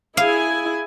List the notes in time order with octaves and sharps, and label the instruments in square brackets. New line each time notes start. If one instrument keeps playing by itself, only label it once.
[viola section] E4 G#4 G#5 [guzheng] F5